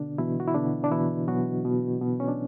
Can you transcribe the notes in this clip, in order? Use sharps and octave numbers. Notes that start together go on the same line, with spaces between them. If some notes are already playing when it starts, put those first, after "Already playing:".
Already playing: B2 D3 D4
B2 E3 E4
F#4
E4
B2 D3 D4
D4
B2 E3 E4
B2 F#3 F#4
B2
B2
C#4
D4